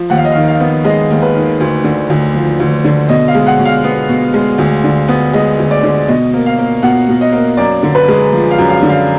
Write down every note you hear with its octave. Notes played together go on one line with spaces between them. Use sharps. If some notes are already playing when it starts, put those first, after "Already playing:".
Already playing: F3
D#2 F#5
F5
D#5
D#3 F5
F5
B3
G#3 D#5
D#2
B4
D#3
D2
D3
D2
F3
D2
D3
B2 D#5
F5
G#3
F#5
B2
F5
B3
B2
G#3
D2
D3
B3
G#3 D#5
D2
D5
D3
B2 D#5
A#3
F5
A#3
B2 F#5
B2
D#5
A#3
F#2 D5
D3
B4
G#3
F3
F5
F#2
F5
D3
F5